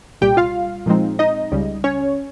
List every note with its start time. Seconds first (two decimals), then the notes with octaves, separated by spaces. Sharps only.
0.21 C2 A#2 G3 G4 G5
0.37 F4 F5
0.86 A#2 F3 G#3 C4 D#4
1.19 D#4 D#5
1.52 C#2 C#3 G3
1.84 C#4 C#5